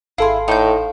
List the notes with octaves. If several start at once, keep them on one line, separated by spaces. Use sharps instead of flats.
G#1 E4 G#4 A4 F5 C6
A2 D#4 G6